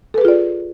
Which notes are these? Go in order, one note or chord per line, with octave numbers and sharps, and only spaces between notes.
F4 G#4 A4 B4 D5